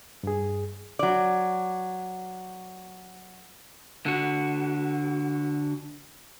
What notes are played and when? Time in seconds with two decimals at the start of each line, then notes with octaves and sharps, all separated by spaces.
0.23 G2 G#4
0.99 F#3 D5
4.06 D3 F#4